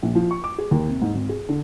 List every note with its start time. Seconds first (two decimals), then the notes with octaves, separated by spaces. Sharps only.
0.03 A#1
0.15 F3
0.31 C#6
0.44 D6
0.58 G#4
0.71 D#2
0.89 C3
1.01 G#2
1.15 G#1
1.29 G#4
1.49 D3